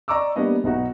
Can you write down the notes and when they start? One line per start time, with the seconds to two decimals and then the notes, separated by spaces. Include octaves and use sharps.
0.08 D5 D#5 A#5 C#6 D6 E6
0.36 G3 A#3 B3 D4 D#5
0.64 B1 B3 D#4 F#4